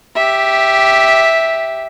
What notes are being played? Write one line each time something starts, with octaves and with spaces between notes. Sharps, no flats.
G4 E5